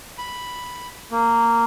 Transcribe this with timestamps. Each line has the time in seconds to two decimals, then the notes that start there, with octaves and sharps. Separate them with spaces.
0.18 B5
1.12 A#3